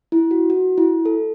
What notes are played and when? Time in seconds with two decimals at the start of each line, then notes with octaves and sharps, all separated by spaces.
0.12 E4
0.31 F#4
0.50 F#4
0.78 E4
1.05 A4